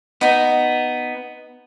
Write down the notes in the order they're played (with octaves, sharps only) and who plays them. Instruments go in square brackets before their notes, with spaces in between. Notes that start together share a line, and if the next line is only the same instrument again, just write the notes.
[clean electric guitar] B3 [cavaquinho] D#4 D#5